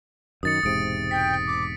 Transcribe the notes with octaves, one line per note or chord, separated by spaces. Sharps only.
F#2 D#3 D#6 A6 C#7
E1 G#2 C3 D#6 D7
G5 B6
D6